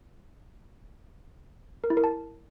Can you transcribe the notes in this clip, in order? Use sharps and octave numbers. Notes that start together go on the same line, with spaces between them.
A#4
E4
A#4
A5